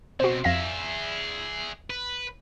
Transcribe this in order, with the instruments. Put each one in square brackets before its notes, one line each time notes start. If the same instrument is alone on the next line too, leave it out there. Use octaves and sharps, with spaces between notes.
[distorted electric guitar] B2 C4 [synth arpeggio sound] F#4 C5
[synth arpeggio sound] F2 F5 A#6 [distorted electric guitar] G#4 E5
[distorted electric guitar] B4